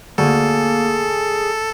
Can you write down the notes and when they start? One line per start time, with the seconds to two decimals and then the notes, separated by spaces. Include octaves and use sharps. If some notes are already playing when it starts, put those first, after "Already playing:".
0.18 D2 A#3 G#4 A4